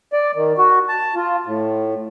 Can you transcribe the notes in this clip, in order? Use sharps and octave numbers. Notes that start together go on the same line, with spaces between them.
D5
D#3
F#4
A5
F4
A2